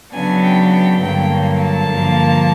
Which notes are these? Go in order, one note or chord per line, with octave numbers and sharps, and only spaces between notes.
C#3 F#3 B3 D4 G#5
G5
G5
G2 D3 F#3 A#3 G5
A5
G2 D3 F3 A#3